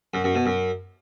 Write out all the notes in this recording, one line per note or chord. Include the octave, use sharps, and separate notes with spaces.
F#2
F#2
B2
F#2